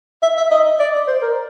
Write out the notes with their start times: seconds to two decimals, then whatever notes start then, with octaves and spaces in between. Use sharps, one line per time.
0.22 E5
0.37 E5
0.51 D#5
0.79 D5
1.08 C5
1.22 A#4